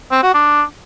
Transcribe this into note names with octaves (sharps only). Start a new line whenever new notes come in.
C4
F#4
D4